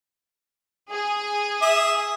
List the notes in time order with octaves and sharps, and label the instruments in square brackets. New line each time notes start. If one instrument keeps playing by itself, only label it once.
[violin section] G#4
[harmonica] E5 D#6